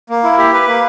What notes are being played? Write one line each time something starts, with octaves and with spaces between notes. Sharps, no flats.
A#3
E4
G4
B4
A#3